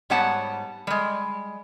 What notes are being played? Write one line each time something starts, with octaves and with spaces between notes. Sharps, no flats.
G#2 G3 B3 C#5 F#5 A5
G3 G#3